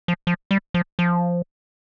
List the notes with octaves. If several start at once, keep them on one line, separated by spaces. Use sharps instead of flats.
F3
F3
G3
F3
F3